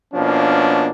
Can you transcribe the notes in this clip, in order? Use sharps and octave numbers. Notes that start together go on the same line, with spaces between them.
B2 F3 A#3 C#4 D4